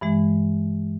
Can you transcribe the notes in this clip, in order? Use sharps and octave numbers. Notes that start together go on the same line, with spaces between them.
G2 E3 G#3